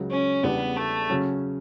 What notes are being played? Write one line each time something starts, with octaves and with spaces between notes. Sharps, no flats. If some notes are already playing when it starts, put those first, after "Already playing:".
Already playing: C#2 C#3 F#3
C#4
E2 C#3 G3 B3 D4 G4
A3
C#3 F#3 C#4